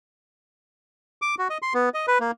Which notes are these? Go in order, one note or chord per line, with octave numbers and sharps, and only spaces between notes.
D6
F#4
D#5
C6
B3
D#5
B4
A#3